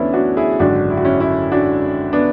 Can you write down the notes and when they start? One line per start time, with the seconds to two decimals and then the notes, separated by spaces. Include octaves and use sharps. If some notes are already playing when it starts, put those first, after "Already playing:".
Already playing: D2 E3 B3 C#4 D4 E4
0.13 D4 F#4
0.37 E4 G#4
0.59 G#1 F#2 D3 D4 F#4
0.90 E4
0.97 F#4
1.04 C#4 E4
1.20 C#4 E4
1.52 D4 F#4
2.13 B3 D4